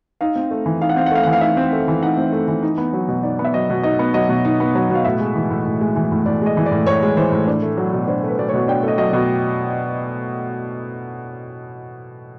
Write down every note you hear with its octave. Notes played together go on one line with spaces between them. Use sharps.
D#4 F5
C4
A3
E3
D#4 F5
F#5
C4 F5
F#5
A3 F5
E3 F#5
F5
D#4 E5
C4
A3
E3
D#4 F#5
C4
A3
E3
D#4
B3
F#3
B2
D#4 D5
B3
E5
F#3 D#5
B2
D#4 D#5
B3
F#3 D#5
B2
D#4
B3
F#3
B2
F5
A2 E5
G#3
E3
A2
A2
G#3
E3
A2
A2 D5
G#3 D#5
E3
D5
A2
A2 C#5
G#3
E3 C5
A2
D4
A3
F#3
B2
D4 C5
A3 B4
F#3 D5
B2 C#5
D4 G5
A3 D#5
F#3 D#5
B2 D5